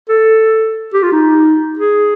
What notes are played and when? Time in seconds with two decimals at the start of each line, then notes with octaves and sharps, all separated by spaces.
0.09 A4
0.94 G4
1.03 F4
1.12 D#4
1.79 G#4